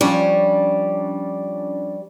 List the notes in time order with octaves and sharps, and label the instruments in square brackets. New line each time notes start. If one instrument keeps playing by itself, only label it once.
[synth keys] F3 C#4 D4 [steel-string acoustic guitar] G3